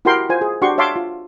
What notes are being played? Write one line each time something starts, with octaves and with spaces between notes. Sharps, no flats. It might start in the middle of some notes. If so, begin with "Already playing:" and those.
E4 F#4 G4 A#4 G5 C6
F4 C5 G#5
G#4
D4 F#4 G4 C6 C#6
C#5 E5 F5 A5 C6 D6
F4